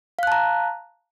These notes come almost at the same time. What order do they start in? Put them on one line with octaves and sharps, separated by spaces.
F5 F#6 A5 A#5